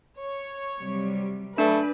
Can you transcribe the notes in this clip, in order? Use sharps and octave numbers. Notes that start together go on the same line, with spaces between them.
C#5
C3 F#3 G3
F#3 A3 D4 B4 D5